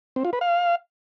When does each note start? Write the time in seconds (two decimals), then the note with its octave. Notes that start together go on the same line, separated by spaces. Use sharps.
0.16 C4
0.25 F4
0.33 B4
0.41 F5